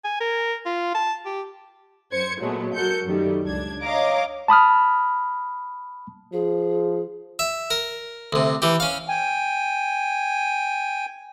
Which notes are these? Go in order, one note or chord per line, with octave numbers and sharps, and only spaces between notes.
G#5
A#4
F4
A5
G4
F#2 C5 G#6 C#7
A#2 F#3 G#3 A3 B3
F#3 F#4 A4 A#4 G6 C#7
F#2 D#3 G3 A3
C#2 D4 G#6
C#5 D#5 F5 A#5 D6
A5 B5 D#6 F6
F3 G#4
E5
A#4
D2 C3
E3 G4
C#4 F5
G5 G#5